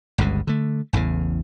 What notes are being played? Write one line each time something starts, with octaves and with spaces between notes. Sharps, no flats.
G1 C#2 G2 C#3
D3 A3
A1 E2 A2 C#3